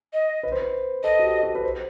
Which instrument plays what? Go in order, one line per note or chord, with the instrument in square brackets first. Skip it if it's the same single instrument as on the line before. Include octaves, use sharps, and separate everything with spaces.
[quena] D#5
[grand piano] B4
C5
B4
[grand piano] A4 [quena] D#5
[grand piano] F#4
G4
F#4
B4
C5